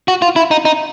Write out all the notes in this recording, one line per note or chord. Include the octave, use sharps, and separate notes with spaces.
F#4
F4
E4
D#4
D#4